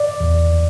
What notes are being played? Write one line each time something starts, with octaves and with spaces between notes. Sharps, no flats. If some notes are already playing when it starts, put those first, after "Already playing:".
Already playing: D5
E2